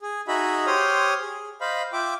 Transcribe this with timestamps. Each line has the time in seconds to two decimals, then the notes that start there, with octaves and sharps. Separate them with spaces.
0.01 G#4
0.28 D#4 F#4 G#4 D#5 E5 B5
0.67 G4 C5 C#5 C6 D#6 F6
1.21 G#4
1.61 C5 D#5 F5 B5
1.93 F4 E5 G5 D6